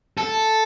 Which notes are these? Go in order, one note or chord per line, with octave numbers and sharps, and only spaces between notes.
A4